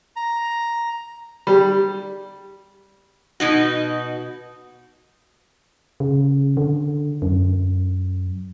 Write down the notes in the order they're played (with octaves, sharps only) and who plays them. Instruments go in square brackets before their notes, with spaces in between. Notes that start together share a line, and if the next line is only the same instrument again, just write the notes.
[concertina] A#5
[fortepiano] G3
[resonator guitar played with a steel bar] B2 D#4 F#4
[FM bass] C#3
D3
F#2